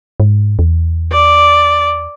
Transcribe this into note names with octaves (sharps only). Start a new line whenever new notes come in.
G#2
E2
D5